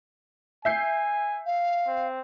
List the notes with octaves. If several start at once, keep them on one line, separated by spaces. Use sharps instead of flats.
E5 G#5 G6 C7
F5
C4